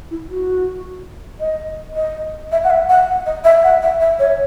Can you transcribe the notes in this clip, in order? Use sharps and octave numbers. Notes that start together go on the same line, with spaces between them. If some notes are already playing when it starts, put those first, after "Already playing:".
E4
F#4
D#5
D#5
E5
F#5
E5
F#5
D#5
E5
F#5
E5
E5
C#5